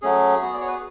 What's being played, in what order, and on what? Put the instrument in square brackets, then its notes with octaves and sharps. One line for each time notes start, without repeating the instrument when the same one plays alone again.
[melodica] F#3 A3 C#4 G#4
B3 F#4
D5
C#5
B4